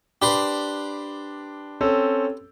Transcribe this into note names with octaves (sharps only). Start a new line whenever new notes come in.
D4 G4 B4 C5
C4 C#4 A4